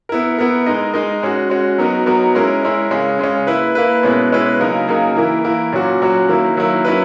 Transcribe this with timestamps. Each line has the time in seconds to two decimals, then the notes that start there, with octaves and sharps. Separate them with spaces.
0.09 B3 E4 A#4
0.39 B3 E4 A#4
0.66 G#3 D#4 A#4 D#5
0.94 G#3 D#4 A#4 D#5
1.23 G#3 C#4 F#4
1.50 G#3 C#4 F#4
1.78 F#3 B3 D#4 F#4 A#4
2.06 F#3 B3 D#4 F#4 A#4
2.35 G#3 C#4 E4 A#4
2.63 G#3 C#4 E4 A#4
2.91 C#3 G#3 C#4
3.19 C#3 G#3 C#4
3.47 A#3 E4 B4
3.75 A#3 E4 B4
4.03 B2 G#3 C#4 E4 B4
4.32 B2 G#3 C#4 E4 B4
4.59 C#3 F#3 A#3 D#4 A#4
4.88 C#3 F#3 A#3 D#4 A#4
5.16 E3 A#3 E4 A#4
5.44 E3 A#3 E4 A#4
5.72 A#2 F#3 C#4 F#4
6.01 A#2 F#3 C#4 F#4
6.29 D#3 F#3 A#3 E4
6.57 D#3 F#3 A#3 E4
6.85 F#3 C#4 E4 B4